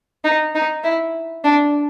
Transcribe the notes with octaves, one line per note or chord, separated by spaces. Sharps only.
D#4
D#4
E4
D4